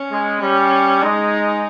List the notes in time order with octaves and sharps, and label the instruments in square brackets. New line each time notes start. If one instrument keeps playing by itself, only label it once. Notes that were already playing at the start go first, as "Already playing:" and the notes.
Already playing: [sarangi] C#4
[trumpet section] G#3
[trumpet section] G3 [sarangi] C#4
[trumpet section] G#3 [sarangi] D#4